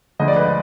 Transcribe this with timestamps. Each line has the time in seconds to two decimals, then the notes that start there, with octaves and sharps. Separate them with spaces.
0.19 D2 D3 F3 G#3 D#5
0.28 D5
0.36 B4
0.45 D5